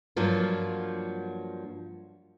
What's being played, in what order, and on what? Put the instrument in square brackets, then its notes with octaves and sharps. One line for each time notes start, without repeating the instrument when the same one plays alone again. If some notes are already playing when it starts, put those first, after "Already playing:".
[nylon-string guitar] G2 F3 F#3 A#3 F4